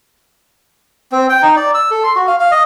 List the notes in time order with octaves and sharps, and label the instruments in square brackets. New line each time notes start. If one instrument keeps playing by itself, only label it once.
[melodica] C4
G5
D#4
D5
E6
A4
C6
F#4
F5
F5
D#5